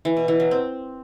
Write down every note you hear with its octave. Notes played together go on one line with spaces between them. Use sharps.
E3
B2
E3
F#3
C4